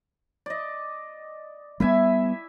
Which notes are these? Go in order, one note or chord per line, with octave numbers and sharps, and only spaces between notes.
D5 D#5
G3 A3 B3 E4 E5 G#5